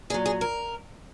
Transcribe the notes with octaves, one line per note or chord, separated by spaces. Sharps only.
A#2 F#3 G#4
G#4
A#4